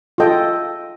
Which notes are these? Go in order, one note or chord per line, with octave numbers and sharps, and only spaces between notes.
F4 A4 D#5 G5